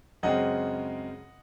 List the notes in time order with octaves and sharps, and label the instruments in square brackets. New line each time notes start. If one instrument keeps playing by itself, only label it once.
[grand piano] F#2 C#3 G#3 C4 D#5 F#5